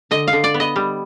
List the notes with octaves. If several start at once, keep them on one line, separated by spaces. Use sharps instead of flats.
D3 D#5
F5
D3
D5
B3
D#5
G3